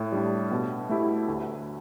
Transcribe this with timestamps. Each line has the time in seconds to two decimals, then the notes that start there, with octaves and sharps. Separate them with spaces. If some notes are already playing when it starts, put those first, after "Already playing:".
Already playing: A2
0.12 G3 D4 G4
0.51 B2
0.89 A3 E4 G4
1.28 D2